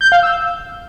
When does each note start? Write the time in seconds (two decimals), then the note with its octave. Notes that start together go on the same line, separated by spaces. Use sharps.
0.01 G6
0.12 F5
0.23 E6